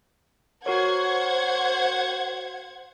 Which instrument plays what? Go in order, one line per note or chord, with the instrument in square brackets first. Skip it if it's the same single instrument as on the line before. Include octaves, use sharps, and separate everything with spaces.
[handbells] F#4 A#4 C#5 [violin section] C5 F#5 G#6